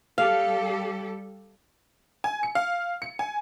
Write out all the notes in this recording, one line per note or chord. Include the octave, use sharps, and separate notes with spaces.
G3 G4 A4 F5
G#5
C#7
F5
C#7
G#5